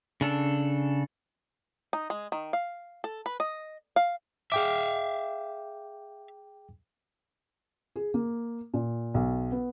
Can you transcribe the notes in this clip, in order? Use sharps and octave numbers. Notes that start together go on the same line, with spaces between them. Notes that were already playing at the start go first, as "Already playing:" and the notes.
C#3 D4 A4
D#4
G#3
D#3
F5
A4
B4
D#5
F5
G#4 E5 F5 G5 D6
G#4
A#3
A#2
B1
B3